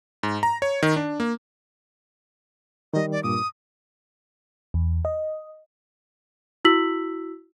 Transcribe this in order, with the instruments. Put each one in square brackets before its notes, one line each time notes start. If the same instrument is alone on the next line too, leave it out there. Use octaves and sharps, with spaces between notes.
[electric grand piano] G#2
A#5
C#5
D#3
D4
A#3
[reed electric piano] D#3 G3 [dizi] D#5
[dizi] D5
[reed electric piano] G2 A#2 D6 [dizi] D#6
[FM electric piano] E2
D#5
[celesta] E4 F#4 E6 B6 F#7